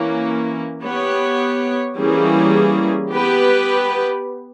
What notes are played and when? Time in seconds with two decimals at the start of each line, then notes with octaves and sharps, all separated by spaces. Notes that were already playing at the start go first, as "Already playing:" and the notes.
Already playing: E3 A#3 C#4
0.84 B3 G4 C#5
1.98 E3 G3 A#3 C#4 G#4
3.12 B3 G4 B4